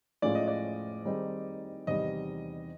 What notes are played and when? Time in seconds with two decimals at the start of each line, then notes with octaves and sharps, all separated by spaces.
0.22 A2 F3 G#3 C#4 F4 D5
0.35 D#5
0.48 D5
1.05 D#3 G3 C4 D#4 G#4
1.87 E2 C3 D#3 G3 D#5